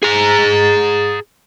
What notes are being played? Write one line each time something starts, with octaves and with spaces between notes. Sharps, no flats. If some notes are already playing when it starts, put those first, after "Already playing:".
G#4 A#5